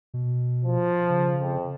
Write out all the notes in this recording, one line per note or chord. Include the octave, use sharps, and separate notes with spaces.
B2
F3
C#3
F2